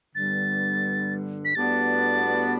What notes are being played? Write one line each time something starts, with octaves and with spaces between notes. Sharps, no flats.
G2 D3 G3 B3 A6
B6
A2 G3 B3 D4 F#4 A6